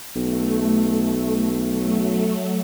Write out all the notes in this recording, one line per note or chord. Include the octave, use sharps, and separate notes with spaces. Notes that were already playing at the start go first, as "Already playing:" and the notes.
B1 A3
F#3 A3